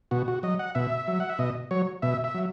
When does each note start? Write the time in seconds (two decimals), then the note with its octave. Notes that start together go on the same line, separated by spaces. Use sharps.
0.11 B2 F#4
0.28 F#4
0.43 F#3 D#5
0.59 F#5
0.75 B2 E5
1.08 F#3
1.20 F#5
1.29 E5
1.39 B2 D#5
1.71 F#3 C#5
2.02 B2 E5
2.24 E5
2.34 F#3